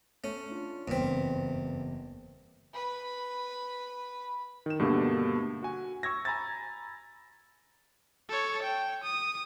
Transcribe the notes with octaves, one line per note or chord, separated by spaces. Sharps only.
A3 C#4
D4 F4
F#1 E2 G2 C4 B6
B4 B5
D#3 E7
G2 B2 D3 A3 A#3 G4
F#4 G#5
C#6 E6 G#6 A#6
G#5 A#5 B5 E6 G#6 A6
A4 C#5
G5
D#6